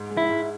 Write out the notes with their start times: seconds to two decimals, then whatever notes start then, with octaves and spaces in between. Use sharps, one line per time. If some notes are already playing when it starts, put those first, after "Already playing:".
Already playing: G#2
0.11 G#3
0.17 E4
0.30 G#2